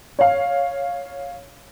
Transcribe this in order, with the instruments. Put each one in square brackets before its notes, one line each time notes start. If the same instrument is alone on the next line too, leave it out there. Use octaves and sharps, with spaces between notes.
[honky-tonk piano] C#5 F5